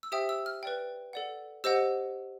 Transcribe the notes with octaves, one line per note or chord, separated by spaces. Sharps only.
E6
G4 C5 E5 G5 D#6
E6
F6
B4 D5 G5
A4 D5 F#5
G4 C5 D#5 F#5 E6